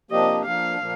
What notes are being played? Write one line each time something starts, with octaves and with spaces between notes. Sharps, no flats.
C3 F3 A#3 D4 G4 D#5
F3 A#3 D4 F5
A#2 F3 A#3